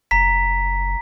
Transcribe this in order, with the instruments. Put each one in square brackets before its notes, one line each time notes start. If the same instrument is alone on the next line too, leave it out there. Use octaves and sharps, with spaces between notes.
[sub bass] F#1 [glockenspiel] A#5 B6